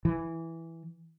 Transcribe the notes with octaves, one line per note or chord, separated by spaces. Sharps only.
E3